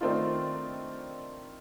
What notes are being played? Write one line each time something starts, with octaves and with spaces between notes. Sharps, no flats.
D#3 A3 C4 D4 D#4 F4